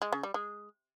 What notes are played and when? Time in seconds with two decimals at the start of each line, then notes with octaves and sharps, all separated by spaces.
0.02 G#3
0.13 C#3
0.23 G3
0.34 G#3